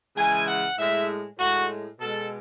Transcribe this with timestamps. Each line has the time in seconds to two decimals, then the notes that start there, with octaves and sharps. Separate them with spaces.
0.16 C#3 E3 G#3 G#5
0.47 F#5
0.78 A2 G#3 E5
1.39 A2 G#3 F#4
2.00 B2 G#3 A4